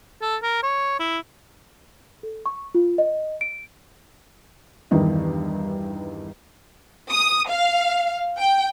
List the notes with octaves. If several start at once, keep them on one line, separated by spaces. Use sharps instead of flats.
A4
A#4
C#5
E4
A4
C#6
F4
D#5
D7
E2 G2 D#3 D#5
D#6
F5
G5